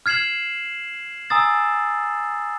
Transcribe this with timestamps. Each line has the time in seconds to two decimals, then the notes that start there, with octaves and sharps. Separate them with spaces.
0.06 F6 G#6 C7 E7 F#7
1.30 G#5 A#5 D#6 E6 A6